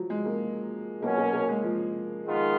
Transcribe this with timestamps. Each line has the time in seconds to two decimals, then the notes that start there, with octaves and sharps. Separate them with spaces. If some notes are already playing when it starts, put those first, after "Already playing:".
Already playing: F3 F#3
0.10 G#3
0.26 A#3
1.02 B2 F#3 A#3 C#4
1.18 A#3
1.33 A#3
1.48 G#3
1.64 F3
2.25 D#3 G#3 B3 F4